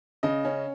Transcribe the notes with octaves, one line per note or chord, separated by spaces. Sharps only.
C#3 D#5
C#4